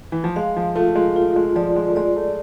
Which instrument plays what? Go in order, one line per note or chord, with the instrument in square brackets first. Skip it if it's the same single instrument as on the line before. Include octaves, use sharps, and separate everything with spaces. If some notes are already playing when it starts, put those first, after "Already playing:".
[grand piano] E3
F3
[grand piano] G#3 [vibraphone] F5
[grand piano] F3
[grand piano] A3 [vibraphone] F4
[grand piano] G#3
[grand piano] A3 [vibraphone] F4
[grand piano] G#3
[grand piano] F3 [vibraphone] D5
[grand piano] G#3
A3
[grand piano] G#3 [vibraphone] D5
[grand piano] A3